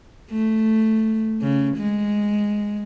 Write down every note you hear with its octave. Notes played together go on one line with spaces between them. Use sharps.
A3
C#3
G#3